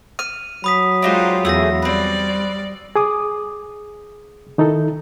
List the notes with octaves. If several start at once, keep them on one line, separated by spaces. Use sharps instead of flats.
F6 D#7
F#3 B5 D#6 B6
G#3 D4 D#4 F4 G4 C5
E2 A3 G#4 E6 A#6
G3 C4 B4 D5
G#4 D6 D#6
D#3 D#4 E4 A4